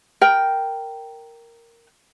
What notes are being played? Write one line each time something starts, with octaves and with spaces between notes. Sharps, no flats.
A#4 G5